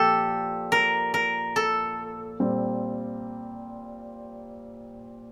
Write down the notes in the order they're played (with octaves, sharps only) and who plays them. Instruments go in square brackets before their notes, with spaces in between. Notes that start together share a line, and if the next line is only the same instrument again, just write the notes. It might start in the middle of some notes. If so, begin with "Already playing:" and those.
Already playing: [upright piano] A#2 F3 [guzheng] G4 A4
[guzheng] A#4
A#4
A4
[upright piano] A#2 G3 C4